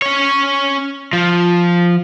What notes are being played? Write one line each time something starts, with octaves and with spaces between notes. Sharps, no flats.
C#4 C#5
F3